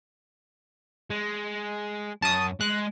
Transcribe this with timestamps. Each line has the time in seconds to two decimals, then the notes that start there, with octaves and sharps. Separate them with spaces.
1.10 G#3
2.22 F#2 A5 D#6
2.61 G#3 F#6